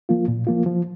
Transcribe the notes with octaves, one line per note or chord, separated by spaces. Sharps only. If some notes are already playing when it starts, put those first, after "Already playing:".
F3 A#3 F4
A#2
F3 A#3 F4
F3